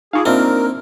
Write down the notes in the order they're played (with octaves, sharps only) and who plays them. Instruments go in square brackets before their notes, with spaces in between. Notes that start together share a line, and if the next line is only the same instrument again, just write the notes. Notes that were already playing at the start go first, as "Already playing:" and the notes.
[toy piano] D#4 F4 [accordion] G#4 [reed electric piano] F5 C#6 D6
[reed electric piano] A#3 D4 D#4 [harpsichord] C4 [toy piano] F4 E5 [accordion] A#4